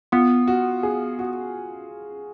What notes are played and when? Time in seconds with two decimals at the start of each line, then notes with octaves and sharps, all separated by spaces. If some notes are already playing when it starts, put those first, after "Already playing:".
0.12 B3 F4
0.48 F#4
0.83 G#4
1.19 F#4